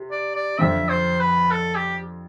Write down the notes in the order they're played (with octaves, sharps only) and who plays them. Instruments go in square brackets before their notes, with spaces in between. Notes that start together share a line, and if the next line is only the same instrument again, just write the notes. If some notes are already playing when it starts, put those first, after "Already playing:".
Already playing: [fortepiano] C3
[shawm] D5
D5
[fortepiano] F2 D3 F3 C4 [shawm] E5
[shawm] C5
B4
A4
G4